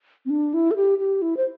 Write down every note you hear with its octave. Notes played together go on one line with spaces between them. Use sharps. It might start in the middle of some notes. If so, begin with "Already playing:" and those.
C4
D4
E4
A4
G4
G4
E4
C5